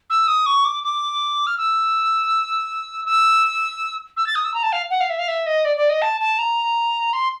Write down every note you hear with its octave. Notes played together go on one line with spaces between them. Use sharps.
E6
D#6
C#6
D6
D6
F6
E6
E6
E6
A6
D#6
E6
A#5
A5
F5
F#5
F5
E5
F5
E5
D#5
D5
D5
D#5
A5
A5
A#5
C6